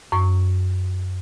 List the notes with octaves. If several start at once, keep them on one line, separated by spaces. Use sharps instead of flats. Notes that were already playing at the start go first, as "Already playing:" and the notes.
F#2 C#6